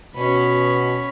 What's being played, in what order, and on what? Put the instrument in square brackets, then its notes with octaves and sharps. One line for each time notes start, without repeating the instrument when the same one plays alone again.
[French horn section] B2 [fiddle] C#4 B5